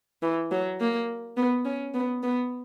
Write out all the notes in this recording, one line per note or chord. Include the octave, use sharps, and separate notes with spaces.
E3
F#3
A#3
B3
C#4
B3
B3